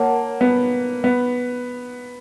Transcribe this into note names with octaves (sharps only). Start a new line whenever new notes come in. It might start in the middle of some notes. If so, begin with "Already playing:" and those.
Already playing: A#3 A#4 C#5 F#5 A5
B3
B3